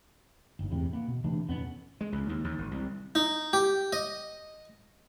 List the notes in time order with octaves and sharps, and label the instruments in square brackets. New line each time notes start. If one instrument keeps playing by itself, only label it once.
[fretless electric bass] G1 G#2
E2 A2 C3
A#3 B3
B2
C3 E3 A3 D4
D#1 F2 B3 C#4
[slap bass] G#3
C#2
D#2
D#2
G#1
C2
[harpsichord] D#4
G4
D#5